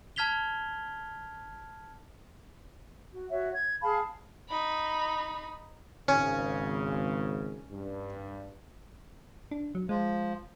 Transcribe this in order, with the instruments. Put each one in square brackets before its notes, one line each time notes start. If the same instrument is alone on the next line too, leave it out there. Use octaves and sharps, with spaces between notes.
[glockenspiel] A5 F6 G#6 B6 F7 G7
[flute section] F#4
F#4 C#5 E5
G#6
G#4 F5 A5 B5
[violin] D#4 B5
[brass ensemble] G#1 C#3 [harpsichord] C#4
[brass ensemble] G2
[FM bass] D4
F#3
[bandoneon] F3 [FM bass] G#3